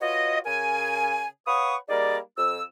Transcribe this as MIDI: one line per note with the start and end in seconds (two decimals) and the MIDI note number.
0.01 0.40 65
0.01 0.40 66
0.01 0.40 71
0.01 0.40 73
0.01 0.40 75
0.46 1.27 49
0.46 1.27 61
0.46 1.27 70
0.46 1.27 80
1.47 1.76 71
1.47 1.76 73
1.47 1.76 77
1.47 1.76 78
1.47 1.76 85
1.47 1.76 87
1.89 2.19 55
1.89 2.19 58
1.89 2.19 63
1.89 2.19 68
1.89 2.19 70
1.89 2.19 74
2.37 2.62 41
2.37 2.62 88